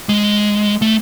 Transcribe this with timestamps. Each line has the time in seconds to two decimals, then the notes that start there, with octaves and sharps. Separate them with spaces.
0.09 G#3
0.82 A3